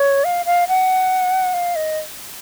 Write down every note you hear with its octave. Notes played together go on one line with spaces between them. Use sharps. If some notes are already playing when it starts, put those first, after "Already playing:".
Already playing: C#5
F5
F5
F#5
F5
D#5